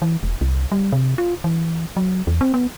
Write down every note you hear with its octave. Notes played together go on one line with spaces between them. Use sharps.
E3
E1
C2
G3
C3
F4
E3
F#3
E2
C4
B3